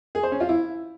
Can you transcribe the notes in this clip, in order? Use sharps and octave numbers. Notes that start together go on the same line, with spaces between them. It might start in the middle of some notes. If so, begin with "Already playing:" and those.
G#4
C5
C#4
F4
E4